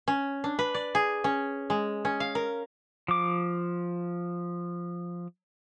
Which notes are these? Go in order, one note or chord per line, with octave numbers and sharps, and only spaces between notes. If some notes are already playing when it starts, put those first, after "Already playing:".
C#4
D4
B4
D5
G#4
C#4
G#3
C#4
F5
A#4
F3 D6